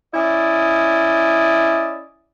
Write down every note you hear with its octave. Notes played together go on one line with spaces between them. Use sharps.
C#4 E4 D5 D#5